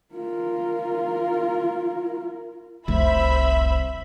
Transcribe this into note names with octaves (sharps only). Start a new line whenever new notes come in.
F4 A#4
F1 C2 C5 E5 B5